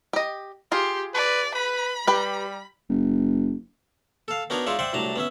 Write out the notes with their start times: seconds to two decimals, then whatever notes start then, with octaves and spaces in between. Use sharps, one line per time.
0.13 G4 D#5
0.72 F4 G4 G#4 C6
1.14 B4 D5
1.54 B4 B5
2.07 G3 G4 B4
2.89 F#1
4.28 A4 F5
4.50 B3 D4 D#4 F#4 A#4 C#5
4.66 G#3 D#4 F4 C#5 D5 E5
4.79 C5 D5 E5 F#5 G5
4.93 C2 A2 F#3 D4 A5 A#5
5.16 B3 C#4 E5